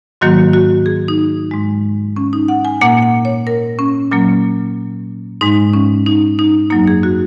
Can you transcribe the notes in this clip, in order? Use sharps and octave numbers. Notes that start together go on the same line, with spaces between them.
G#2 D#3 F#3 A#3 F#4
F#4
G#4
D#4
G#2 G#3
C#4
D#4
F#5
G#5
A#2 A#3 F#5
F#5
C#5
A#4
C#4
A#2 F#3 A#3 C#4
G#2 G#3 D#4
C#4
D#4
D#4
F#2 F#3 A#3 D#4
G#4
F#4